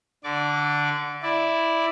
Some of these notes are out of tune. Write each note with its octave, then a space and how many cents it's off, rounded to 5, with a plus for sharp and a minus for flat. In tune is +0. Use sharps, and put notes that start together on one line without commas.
D3 +0 D5 +0 D6 -35
E4 +0 D5 +0